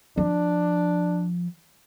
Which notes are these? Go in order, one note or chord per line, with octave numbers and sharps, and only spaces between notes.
F3 D4